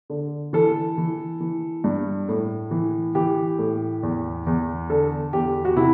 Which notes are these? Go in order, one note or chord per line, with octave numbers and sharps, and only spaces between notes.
D3
E3 A4
E3
E3
G2
A2
E3
E3 G4
A2
E2
E2
D3 A4
E2 G4
F#4
C3 E4